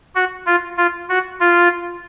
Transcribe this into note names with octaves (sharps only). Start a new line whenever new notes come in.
F#4
F4
F4
F#4
F4